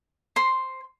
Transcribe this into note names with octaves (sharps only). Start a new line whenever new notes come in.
C5 C6